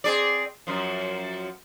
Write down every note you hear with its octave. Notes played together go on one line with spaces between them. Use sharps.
C4 G#4 D5
F#2 F3